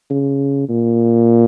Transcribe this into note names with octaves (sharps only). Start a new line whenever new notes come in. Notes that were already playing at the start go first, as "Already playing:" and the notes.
C#3
A#2